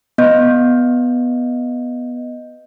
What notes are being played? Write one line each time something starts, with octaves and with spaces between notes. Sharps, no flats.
B3 D#5 G6